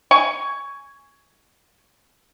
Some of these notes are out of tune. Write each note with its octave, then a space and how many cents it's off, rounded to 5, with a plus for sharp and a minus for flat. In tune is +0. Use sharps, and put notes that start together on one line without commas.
G#5 +0 C#6 +15